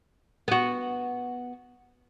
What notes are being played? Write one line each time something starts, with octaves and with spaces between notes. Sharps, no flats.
B3 F#4